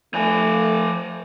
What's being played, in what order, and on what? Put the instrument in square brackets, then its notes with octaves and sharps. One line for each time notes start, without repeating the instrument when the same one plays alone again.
[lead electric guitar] F3 G#5 [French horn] A3